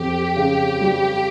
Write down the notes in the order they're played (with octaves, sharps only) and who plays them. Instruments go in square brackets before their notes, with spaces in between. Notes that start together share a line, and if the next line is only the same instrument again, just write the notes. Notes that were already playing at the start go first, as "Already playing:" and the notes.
Already playing: [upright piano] F2 C4 [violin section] G4
[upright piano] C#3
G3